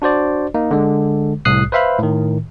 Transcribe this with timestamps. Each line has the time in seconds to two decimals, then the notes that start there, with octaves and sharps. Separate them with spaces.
0.02 D4 F#4 C5 D5
0.54 A#3 D#4
0.71 D3 G#3
1.45 C2 A2 D#6 F#6 C7
1.72 B4 C5 E5 F5 B5
1.99 A2 D#3